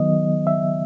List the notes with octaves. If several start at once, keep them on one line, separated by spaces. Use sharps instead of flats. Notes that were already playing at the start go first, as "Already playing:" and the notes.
Already playing: D#3 F#3 B3 D#5
E5